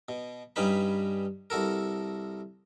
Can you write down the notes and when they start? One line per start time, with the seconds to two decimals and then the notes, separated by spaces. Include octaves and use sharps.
0.09 B2
0.56 G2 G3 C#4 D#4 B4 B5
1.50 C2 F#4 A4 A#4